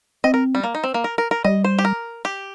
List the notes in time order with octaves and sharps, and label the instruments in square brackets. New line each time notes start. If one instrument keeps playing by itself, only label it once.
[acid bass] C4 [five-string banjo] D#5
[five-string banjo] A#4
G3
A#3
D#4
C4
A#3
A#4
A#4
A#4
[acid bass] G3 [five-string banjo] D#5
[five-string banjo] C5
G4
A#4
G4